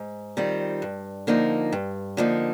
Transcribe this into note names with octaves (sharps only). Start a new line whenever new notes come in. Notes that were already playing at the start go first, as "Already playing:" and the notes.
Already playing: G#2
D#3 G3 C4 F4
G2
D3 F3 A#3 D#4
G2
D3 F3 A#3 D#4